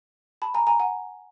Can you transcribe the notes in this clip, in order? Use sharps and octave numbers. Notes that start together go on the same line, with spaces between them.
A5 B5
G#5 A#5
G#5 A#5
F#5 G#5